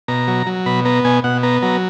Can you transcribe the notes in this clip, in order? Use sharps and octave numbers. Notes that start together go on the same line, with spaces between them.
B2 A#5
F#3
F#3
B2 B5
B3 A#5
B2 G#5
B2 F#5
B3 A#5
F#3 A#5